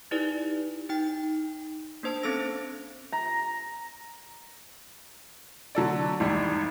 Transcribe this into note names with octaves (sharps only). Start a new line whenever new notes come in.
D#4 E4 G4 B4 D5
D#4 G5
A#3 D4 C5 A5
C4 C#4 A4 C5 E6 A#6
A#5
D3 F#3 A4 D5
G#1 E2 G3